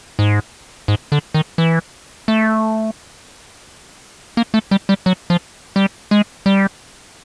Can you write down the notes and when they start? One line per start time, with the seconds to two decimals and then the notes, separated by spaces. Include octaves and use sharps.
0.19 G#2
0.88 G#2
1.12 D3
1.34 D#3
1.58 E3
2.28 A3
4.37 A#3
4.54 A3
4.71 G3
4.89 G3
5.06 F#3
5.30 F3
5.76 G3
6.11 G#3
6.46 G3